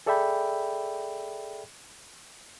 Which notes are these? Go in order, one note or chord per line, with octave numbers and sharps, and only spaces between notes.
G#4 A4 D5 E5 G5 B5